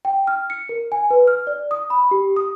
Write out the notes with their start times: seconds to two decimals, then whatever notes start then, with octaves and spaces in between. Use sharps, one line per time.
0.05 G5
0.27 F6
0.50 C#7
0.69 A#4
0.92 G#5
1.11 B4
1.27 F6
1.47 D5
1.71 D#6
1.90 B5
2.11 G4
2.36 D#6